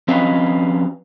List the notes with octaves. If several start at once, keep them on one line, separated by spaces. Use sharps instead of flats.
F3 C4 C#4 B4 D#5 F5